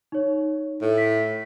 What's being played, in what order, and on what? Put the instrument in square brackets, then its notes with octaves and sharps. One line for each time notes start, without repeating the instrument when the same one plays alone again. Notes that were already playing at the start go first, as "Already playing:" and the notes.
[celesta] D#4 C#5
[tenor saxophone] A2
[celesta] B6